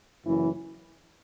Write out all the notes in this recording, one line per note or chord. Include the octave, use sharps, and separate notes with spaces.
F#1 F#2 E3